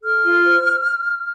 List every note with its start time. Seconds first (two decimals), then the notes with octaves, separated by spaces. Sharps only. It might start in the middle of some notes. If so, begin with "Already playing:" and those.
0.02 A4 F6
0.23 F4
0.44 C5